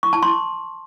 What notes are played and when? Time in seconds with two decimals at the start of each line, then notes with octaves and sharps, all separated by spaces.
0.03 C#6
0.13 A5
0.23 C6